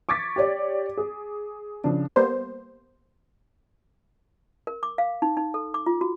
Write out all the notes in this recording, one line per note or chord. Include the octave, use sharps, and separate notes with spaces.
C#6 D6 G#6 A6 B6
G4 C#5 D5
G#4
C#3 F3 D4
G3 A#3 B3 C5
A#4
D6
F5
D#4
D#4
A4
D6
F4
F#4